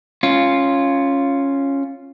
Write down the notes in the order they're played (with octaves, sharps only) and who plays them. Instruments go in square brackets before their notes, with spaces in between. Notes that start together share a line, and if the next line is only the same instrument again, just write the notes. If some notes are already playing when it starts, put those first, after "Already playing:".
[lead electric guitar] C#4 F4